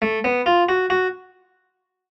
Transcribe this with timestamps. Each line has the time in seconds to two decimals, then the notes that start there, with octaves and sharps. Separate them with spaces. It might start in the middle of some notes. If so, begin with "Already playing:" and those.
0.02 A3
0.24 B3
0.46 F4
0.69 F#4
0.90 F#4